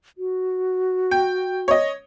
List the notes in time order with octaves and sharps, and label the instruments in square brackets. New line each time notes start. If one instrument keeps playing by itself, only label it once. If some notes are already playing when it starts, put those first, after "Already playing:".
[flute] F#4
[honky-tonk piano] G5
C#5 D#5